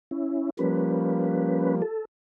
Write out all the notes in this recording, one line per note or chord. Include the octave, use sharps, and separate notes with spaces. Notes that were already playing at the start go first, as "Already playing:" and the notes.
C#4 E4
F3 G3 A#3 C#4 B4
A4